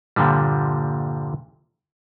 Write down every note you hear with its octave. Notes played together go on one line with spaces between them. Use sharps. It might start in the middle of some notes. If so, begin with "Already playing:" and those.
G2 A#2 D3 F3 G3